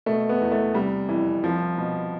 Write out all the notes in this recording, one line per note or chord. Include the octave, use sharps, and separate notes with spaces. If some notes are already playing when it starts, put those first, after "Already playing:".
B2 A3
B3
E2
A3
C3 G3
F2 E3
C2 F3
B2